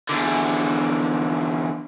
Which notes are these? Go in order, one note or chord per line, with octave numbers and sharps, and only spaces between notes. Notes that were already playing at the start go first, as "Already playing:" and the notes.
E2 D3